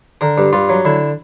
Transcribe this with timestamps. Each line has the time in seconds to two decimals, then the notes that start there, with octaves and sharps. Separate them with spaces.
0.21 D3 A#4
0.38 G2
0.53 G2 F4
0.69 F#3
0.85 D3 E4